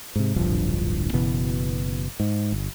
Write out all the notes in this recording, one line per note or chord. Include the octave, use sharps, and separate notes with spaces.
G#2 C3
D1 A#1 G2 F3
F#1 B2 E3 B3
G#2
G1